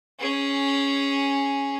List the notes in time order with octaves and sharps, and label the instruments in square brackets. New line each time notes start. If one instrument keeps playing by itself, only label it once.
[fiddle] C#4 G#4